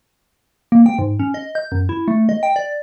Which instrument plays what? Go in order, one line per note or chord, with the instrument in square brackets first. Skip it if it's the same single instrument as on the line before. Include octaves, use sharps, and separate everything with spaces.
[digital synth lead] A#3
G5
G#2
C#4
D#5
G6
F#2
E4
A3
D#5
G5
D5